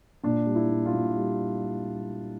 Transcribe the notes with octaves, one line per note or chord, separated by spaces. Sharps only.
A#2 D4
G3
E4
A#2
F4
A#2
G3